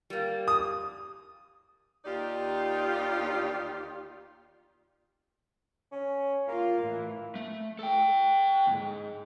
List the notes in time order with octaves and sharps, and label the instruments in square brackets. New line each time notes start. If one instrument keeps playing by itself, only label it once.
[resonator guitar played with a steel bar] G3 A#3
[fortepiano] D#6
[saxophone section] D#2 D#4 F4 G4 D5
[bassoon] C#4
[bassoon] A#3 [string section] F4 F5
[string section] A2 E3
[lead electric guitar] A3
A4 G5
D2 G#2